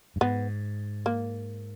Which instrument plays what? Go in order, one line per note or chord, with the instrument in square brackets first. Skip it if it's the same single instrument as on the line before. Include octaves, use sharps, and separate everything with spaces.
[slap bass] G2
[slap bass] G#2 [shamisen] B3
[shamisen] A#3